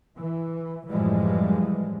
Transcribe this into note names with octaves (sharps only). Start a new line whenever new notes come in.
E3
F#2 A2 E3 F3 G3 G#3